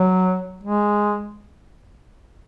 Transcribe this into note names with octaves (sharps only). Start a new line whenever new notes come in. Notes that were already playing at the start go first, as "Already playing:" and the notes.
Already playing: F#3
G#3